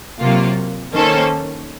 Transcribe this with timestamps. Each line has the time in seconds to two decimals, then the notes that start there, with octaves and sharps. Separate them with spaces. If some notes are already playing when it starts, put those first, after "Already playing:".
0.21 C3 F#3 A#3 F4
0.94 D#3 A#3 C#4 A4 C5